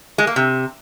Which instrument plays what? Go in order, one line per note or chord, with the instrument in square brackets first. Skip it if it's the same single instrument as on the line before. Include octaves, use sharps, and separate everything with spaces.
[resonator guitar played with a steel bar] G#3
A#3
C3